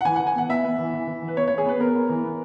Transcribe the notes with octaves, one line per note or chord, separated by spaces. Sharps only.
F#5
E3 G#5
E3 F#5
G#5
B3 F#5
B3 E5
B3
E3
E3
E3
E3
B4
B3 C#5
B3 C#5
G#4
B3 B4
B3 A#4
B3
E3
B3